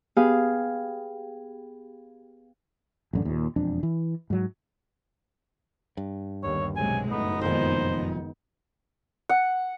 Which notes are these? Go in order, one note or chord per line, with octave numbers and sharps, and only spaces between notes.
B3 G4 G#4 F5 D#6
A1 F#2 D3
D#2 A#2
E1 F2 D4
E3
G#2 F#3
G2
G1 D#2 C#5
B1 C3 F#3 G#3 G#5
F#1 A2 B3 D#4
F1 F2 A#2 D#3 G#3 B3 C5
F#5